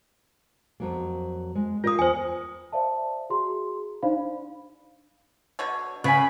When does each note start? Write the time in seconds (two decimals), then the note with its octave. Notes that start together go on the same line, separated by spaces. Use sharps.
0.80 F2 F#3 A#3
1.55 G#3
1.84 F4 A#4 D#5 F5 D#6
1.99 E2 C5 G#5
2.72 C5 D5 E5 F5 A5
3.30 F#4 G#4 A#5 C6
4.03 D4 D#4 C5 D5 F5 B5
5.59 B2 D3 C#5
6.04 C#3 B3 B4 G#5 B5